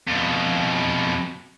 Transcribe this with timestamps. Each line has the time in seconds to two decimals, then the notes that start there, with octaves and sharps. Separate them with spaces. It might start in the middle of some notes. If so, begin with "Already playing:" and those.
0.08 F2 B2